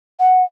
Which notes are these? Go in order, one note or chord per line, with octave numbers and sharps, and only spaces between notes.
F#5